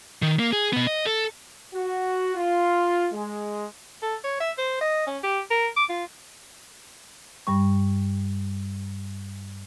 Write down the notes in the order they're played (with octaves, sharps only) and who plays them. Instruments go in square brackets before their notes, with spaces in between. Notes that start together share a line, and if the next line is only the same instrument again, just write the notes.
[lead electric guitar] D#3
A#3
G#4
B2 B3
D#5
A4
[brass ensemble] F#4
F4
G#3
[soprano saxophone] A4
C#5
E5
C5
D#5
C#4
G4
A#4
D6
F4
[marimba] G2 G3 C#6